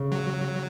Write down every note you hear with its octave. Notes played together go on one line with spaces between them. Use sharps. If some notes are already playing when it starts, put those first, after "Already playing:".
Already playing: C#3
F#3